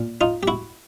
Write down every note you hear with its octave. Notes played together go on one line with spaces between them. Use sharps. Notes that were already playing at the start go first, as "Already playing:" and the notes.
Already playing: A#2
D#4 F4
G4
E4 F#4